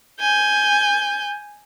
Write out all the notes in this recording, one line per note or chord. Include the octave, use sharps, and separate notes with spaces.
G#5 G6